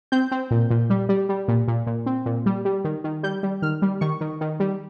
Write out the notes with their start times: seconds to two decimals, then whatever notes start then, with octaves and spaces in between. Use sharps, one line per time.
0.12 C4 G6
0.31 C4
0.51 A#2
0.70 A#2
0.90 G3
1.09 G3
1.29 G3
1.48 A#2
1.68 A#2
1.87 A#2
2.06 C4
2.26 A#2
2.46 G3
2.65 G3
2.84 D#3
3.04 D#3
3.23 G3 G6
3.43 G3
3.62 D#3 F6
3.82 G3
4.01 D#3 C#6
4.21 D#3
4.41 D#3
4.60 G3